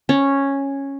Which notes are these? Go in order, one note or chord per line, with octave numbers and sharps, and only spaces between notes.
C#4